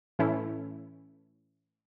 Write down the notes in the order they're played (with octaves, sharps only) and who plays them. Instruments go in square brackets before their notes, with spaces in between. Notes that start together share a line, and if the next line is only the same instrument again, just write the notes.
[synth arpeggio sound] A2 E3 A3 C#4 E4